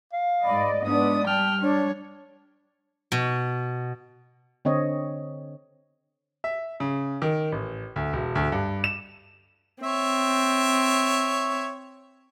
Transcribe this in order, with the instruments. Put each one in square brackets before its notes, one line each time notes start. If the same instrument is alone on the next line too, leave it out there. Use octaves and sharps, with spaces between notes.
[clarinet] F5
[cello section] G#2 D5 D#5 [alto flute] B5
[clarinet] G#3 [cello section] B3 D5 [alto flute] D4 [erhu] D#6
[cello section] G3 [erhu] G5 [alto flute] A5 [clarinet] F6
[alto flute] D4 [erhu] C#5
[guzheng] B2
[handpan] D3 C4 C#5 D#5
[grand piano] E5
C#3
D#3
A1
D2
E1
D2
G2
E7
[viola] C4 [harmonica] C#5 E5